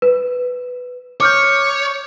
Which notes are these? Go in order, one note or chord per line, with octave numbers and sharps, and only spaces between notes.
B4
C#5 D6 F6 G6